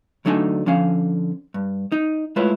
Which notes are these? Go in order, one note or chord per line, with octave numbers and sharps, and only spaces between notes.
D2 F#3 A3 D4 D#4 G#5
D3 F3 C#4 F5
G2
D#4
G#3 A3 E4 F4 B4 C#5